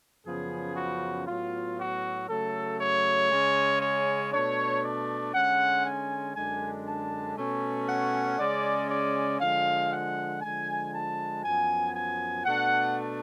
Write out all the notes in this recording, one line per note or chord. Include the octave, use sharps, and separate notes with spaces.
F#2 C#3 F3 B3 G#4
F#4
A2 F#3 B3 F4
F#4
C#3 F#3 A3 A4
C#5
C#3 G#3 C#4
C#5
B2 A3 D4 C#5
D5
D3 G#3 C#4 F#5
G#5
F#2 D3 G#3 D4 G#5
A5
B2 A3 C#4
F#5
C#3 G#3 C#4 D5
D5
D3 F3 G#3 F5
F#5
D3 F3 G#3 G#5
A5
F#2 F3 B3 G#5
G#5
B2 A3 D4 F#5